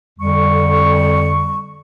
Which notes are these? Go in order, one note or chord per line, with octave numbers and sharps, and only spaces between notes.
F2 D3 G3 C#6